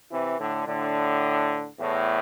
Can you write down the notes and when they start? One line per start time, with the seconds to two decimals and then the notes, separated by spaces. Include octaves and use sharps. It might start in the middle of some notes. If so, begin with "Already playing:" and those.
0.11 C3 E3
0.39 A2 D3
0.67 A2 D3
1.79 E2 A2